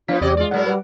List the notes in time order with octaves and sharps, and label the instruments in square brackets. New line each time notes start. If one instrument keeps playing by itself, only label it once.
[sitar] F3 B3 [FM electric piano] D4 F5 B6 [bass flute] F4
[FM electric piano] E2 [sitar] C3 D5 D#5 [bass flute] G4
[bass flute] G#3 [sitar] F4 D5
[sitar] A2 F#3 A#4 [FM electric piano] F#5
[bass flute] G3 [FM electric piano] B4 F#5